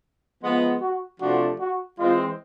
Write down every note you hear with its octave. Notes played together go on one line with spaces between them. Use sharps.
F3 G#3 B3
F#4
C3 F3 A3 D4 F#4
F#4
E3 G#3 C4 F4